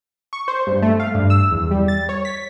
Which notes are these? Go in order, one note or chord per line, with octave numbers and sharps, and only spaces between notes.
C#6
C5
G2
A3
F5
G2
E6
E2
G3
A6
C#5
B6